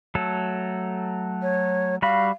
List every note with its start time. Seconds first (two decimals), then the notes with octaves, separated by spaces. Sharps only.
0.15 F#3 A3 A4
1.42 C#5
2.02 G3 F#4 F5 B5